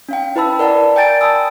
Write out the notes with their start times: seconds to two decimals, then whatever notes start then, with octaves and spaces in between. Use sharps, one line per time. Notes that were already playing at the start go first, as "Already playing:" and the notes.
0.09 C#4 F5 G5
0.36 E4 B4 A5 B5 E6
0.59 A#4 D5 F#5 A5 A#5
0.96 D5 G5 G#5 G6 A6 D7
1.21 A5 B5 D#6 E6